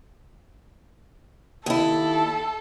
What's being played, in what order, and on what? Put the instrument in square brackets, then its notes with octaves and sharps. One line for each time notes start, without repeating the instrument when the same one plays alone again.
[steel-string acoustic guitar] D#2 E4 [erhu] A4